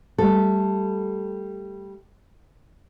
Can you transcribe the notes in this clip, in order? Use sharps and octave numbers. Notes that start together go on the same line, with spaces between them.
G3 A3 A4